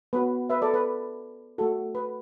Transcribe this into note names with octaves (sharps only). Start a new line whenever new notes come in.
B3 F#4 B4
B4 E5
A4 D5
B4
A3 F#4 A4
B4